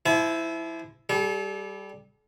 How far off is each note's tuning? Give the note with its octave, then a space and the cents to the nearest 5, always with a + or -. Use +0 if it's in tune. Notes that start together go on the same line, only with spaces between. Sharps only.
F3 -30 E4 +0 A5 -45
G3 +0 A4 -45